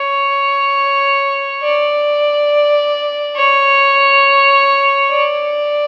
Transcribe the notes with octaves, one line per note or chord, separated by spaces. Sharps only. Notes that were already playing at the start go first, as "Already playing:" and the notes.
Already playing: C#5
D5
C#5
D5